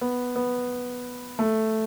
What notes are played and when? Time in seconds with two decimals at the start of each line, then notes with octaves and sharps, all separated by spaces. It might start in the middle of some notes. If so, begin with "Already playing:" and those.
0.01 B3
0.36 B3
1.39 A3